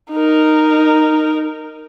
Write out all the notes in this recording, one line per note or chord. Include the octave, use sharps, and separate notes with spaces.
D#4 A#4